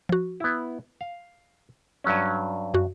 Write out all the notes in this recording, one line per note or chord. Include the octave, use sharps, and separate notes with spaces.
F3 F#4
B3 E4
F5
G2 F#3 C#4
F#2 F#4